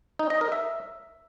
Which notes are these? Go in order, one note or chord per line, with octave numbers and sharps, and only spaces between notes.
D#4
D#5
A#4
E5